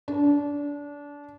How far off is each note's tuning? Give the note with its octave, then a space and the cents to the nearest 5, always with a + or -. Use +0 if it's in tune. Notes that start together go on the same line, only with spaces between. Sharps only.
D4 -25